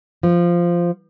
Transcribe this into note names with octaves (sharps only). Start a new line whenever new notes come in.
F3